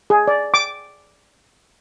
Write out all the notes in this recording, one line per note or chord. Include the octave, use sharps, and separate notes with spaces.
G#4
D5
D6